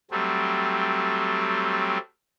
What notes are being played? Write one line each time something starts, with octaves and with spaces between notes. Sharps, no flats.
F#3 G3 A3 C4